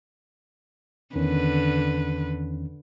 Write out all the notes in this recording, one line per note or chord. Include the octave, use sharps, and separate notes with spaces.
E2 D3 D#3 C#4 B4